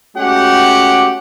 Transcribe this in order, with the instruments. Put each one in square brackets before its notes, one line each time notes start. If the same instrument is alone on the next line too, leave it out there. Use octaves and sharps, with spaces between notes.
[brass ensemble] G#3 A3 C#4 F#4 G4 F#5